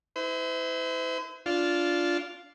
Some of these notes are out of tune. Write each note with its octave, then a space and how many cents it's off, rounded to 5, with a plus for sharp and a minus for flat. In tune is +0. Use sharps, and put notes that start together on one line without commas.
E4 -25 C5 -45
D4 -10 F4 +0